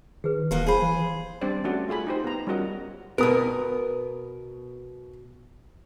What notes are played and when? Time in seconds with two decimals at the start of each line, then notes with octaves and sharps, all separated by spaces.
0.24 D#3 G#4 B4
0.51 D#1 B2 A#3 B3 G4
0.67 G#4 C5 F5 B5
0.82 E3
1.41 G3 C4 D4 C5 D5
1.64 A3 C#4 F#4 D5
1.88 A3 F4 G#4 G#5 B5
2.07 D#4 G4 C5
2.24 B3 A#5
2.47 G3 C#4 F4 F#4 A#4 D#5
3.18 B2 B3 A#4 D#6